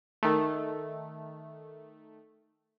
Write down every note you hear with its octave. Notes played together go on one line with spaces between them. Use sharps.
D#3 A3